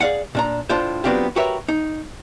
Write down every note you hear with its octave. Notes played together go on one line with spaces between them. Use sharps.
G#4 A#4 D5 F5 F#5
A#2 D4 A#5
A2 D4 F4 C5
F#3 B3 C4 D4 F4 G4
F#4 G4 A#4 B4 C#5 E5
D#4